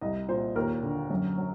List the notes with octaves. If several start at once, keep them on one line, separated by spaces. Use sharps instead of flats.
C2 D#5
A#2 C5
D#2 A#4
D3
F#2
F#3